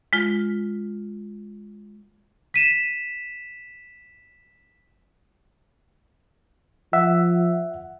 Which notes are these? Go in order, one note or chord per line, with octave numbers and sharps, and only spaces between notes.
G#3 F4
B6 D#7 E7
F3 E5 F#5